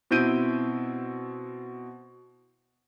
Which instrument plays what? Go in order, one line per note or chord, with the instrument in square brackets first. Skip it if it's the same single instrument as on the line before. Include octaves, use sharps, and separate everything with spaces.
[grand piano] B2 C4 E4 G6 D7 D#7